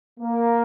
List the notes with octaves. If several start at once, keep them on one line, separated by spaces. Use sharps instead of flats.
A#3